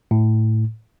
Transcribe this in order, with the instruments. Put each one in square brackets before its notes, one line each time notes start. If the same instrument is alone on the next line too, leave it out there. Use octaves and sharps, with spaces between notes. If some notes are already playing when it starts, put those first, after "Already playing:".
[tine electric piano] A2